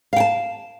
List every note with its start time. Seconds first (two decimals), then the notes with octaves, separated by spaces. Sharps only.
0.13 F5
0.16 G5
0.20 A5